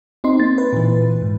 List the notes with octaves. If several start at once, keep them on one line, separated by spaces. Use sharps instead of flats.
C4 D#4 C6
A#3 A6
B4
A#2 E3
G#2